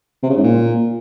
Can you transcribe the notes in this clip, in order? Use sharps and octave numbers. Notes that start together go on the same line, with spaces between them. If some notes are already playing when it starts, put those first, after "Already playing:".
C3
C#3
G#2
A#2